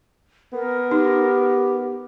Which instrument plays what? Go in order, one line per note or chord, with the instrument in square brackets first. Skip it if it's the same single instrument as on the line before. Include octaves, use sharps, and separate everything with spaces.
[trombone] B3 [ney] A#4
[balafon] D#4 [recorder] G4